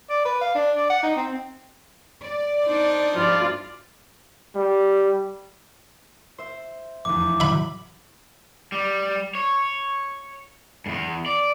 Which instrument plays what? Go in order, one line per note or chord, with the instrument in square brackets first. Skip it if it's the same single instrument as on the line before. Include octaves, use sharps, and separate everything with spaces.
[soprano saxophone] D5
B4
F5
D4
D5
F#5
D#4
C4
[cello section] D5
[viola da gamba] D4 D#4 C5
[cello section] G2 F3 [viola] F4 D5
[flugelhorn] G3
[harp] C5 E5
[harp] F1 E2 [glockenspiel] D6
[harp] A2 C#3 F#3 [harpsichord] E5 B5
[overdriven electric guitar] G3
C#5
E2 G2
D5